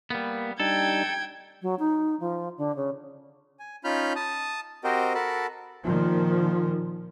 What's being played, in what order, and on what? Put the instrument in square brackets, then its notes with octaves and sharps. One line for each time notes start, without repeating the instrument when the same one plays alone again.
[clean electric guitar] G3 B3 [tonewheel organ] A#3
[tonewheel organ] G3 D4 D#4 [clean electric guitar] A4 [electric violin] G5 G#6
[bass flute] F#3
D#4
F3
D3
C#3
[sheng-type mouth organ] G#5
C#4 D#4 F4 B5 F6 G6
A5 D#6
C4 F#4 G4 A#4 C5 D#5
F#4 A4 A#4 A5 B5
[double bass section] A#2 D#3 F3